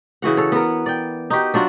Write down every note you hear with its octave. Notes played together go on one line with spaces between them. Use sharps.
C#3 E3 F#4 F#5
A4 C#5
B3 A#4
D5 G5
D#4 F#4 G4
F#3 D4 F4 F#4